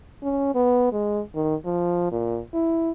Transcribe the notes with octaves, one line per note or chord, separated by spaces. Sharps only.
C#4
B3
G#3
D#3
F3
A#2
E4